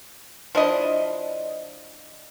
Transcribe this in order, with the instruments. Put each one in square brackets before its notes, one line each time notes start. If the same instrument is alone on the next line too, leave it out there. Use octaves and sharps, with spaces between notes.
[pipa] F3 D4 E4 D#5